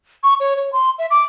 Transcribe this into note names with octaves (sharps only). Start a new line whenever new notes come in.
C#6
C#5
C#5
C6
E5
D6